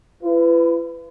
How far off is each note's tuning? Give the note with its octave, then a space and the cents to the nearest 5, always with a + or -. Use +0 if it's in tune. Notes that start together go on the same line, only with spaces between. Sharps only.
E4 +45 B4 +20